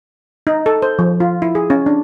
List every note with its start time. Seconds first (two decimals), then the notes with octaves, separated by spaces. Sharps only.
0.47 D#4
0.66 A4
0.82 C5
0.99 F3
1.20 F4
1.42 E4
1.55 G#4
1.70 C#4
1.86 D4